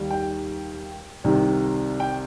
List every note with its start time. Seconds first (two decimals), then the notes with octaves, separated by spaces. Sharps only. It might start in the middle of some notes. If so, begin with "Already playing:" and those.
Already playing: D#2 D#3 G3
0.11 G5
1.24 C2 C3 D#3
2.00 G5